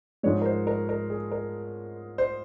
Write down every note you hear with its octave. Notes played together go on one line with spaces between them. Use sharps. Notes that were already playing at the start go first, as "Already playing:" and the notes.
G#2 F3 G#3 C#5
A#4
C5
A#4
A#4
G#4
A#4
C5